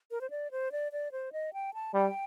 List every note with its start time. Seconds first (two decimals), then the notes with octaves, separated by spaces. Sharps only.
0.11 A#4
0.21 C5
0.30 D5
0.51 C5
0.72 D5
0.92 D5
1.12 C5
1.33 D#5
1.53 G5
1.74 A5
1.94 G3 G5